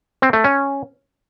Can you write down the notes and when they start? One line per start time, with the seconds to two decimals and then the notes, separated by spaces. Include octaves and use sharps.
0.22 C4
0.33 A3
0.44 C#4